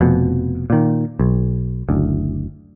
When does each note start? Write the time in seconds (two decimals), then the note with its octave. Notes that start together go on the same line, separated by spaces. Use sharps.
0.01 F1 F2 B2
0.70 A#2 D#3
1.19 B1
1.89 F#1 D2